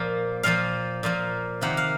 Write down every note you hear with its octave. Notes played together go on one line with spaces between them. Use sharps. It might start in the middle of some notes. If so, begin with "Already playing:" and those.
Already playing: A#2 F3 A#3
A#2 F3 A#3 F5
A#2 F3 A#3
C3 D#3 A#3 F#5
F5